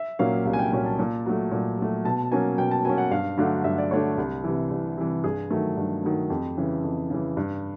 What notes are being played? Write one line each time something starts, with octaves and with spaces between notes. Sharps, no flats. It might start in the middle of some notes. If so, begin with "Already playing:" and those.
Already playing: E5
A#2 F#3 A#3 C#4 F5
C2 F5
G#5
G5
A#2 F#3 A#3 C#4 G#5
A5
A#2
F#3 A3
A#2
F#3 A3
B2 A5
F#3 A#3 C#4 G#5
B2 G5
A5
F#3 A#3 C#4 G#5
F#5
G2 F5
D3 F#3 A3 D4 F5
G2 E5
D5
D3 F#3 A3 D4 C#5
C2
C3 E3
C2
C3 E3
G2 G#4
D#3 F#3 A3
G2
D#3 F#3 A3
F2 G4
C#3 E3
F2
C#3 E3
G2